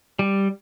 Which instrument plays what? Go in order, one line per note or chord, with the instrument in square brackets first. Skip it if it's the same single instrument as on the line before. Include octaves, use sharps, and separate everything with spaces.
[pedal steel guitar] G3